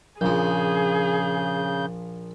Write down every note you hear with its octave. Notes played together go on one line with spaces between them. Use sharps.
A#1 C#3 F3 G#4 G6